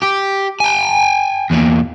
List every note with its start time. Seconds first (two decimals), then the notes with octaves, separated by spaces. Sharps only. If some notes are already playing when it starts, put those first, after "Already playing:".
0.02 G4
0.60 G5 G#5
1.51 E2 A#2